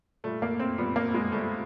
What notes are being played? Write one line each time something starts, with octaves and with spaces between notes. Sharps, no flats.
A#2 G3 A3
A#3
C4
A#2 G3 B3
A#3
G#3
A#2 G3 A3